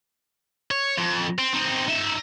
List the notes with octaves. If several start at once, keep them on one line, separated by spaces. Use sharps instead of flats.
C#5
F2
C4
C4 D#4
D#4 E5